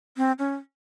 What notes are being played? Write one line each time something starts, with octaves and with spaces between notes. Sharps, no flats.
C4
C#4